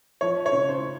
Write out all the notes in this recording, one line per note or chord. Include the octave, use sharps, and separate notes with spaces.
F3 C#5
C#5
C#3
C5